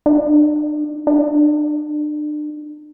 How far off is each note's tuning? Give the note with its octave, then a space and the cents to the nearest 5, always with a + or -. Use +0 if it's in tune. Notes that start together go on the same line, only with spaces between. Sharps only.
D4 +40
D4 +35